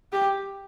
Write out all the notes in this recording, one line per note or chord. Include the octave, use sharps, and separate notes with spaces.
G4